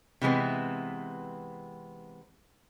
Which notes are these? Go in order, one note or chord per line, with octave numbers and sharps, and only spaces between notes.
C3 E3 G#3 B3 C4